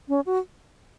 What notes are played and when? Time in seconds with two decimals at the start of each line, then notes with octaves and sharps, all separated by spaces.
0.09 C#4
0.26 F#4